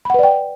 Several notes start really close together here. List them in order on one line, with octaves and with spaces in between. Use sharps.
B5 F#5 B4 D5 G5